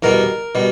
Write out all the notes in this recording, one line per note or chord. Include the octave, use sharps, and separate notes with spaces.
E2 B2 G3 A#4
B2 G3